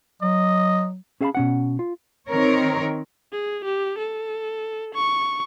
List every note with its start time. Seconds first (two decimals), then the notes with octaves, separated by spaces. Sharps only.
0.22 F#3 D#5
1.21 C#4 G#4 E5 F5 A5 B5
1.35 B2 C#4 F#5
1.79 F4
2.30 D#3 C4 A#4 C#5
3.32 G#4
3.65 G4
3.98 A4
4.95 C#6